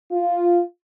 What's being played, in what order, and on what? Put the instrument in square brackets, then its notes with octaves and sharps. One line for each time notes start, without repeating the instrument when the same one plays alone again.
[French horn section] F4